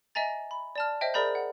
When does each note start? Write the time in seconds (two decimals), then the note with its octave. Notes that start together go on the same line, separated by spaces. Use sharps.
0.15 D#5 E5 G#5 A#5 A6
0.51 B5
0.76 D5 A5 F6
1.01 C5 D#5 E5 G5
1.14 G#4 A#4 D5 A#5 B5 G6
1.35 F#5